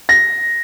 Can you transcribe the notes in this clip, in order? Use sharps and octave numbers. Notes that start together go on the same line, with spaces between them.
A#6